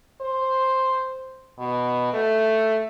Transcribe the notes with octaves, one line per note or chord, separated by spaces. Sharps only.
C5
B2
A3